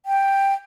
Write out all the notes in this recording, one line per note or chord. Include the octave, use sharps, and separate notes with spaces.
G5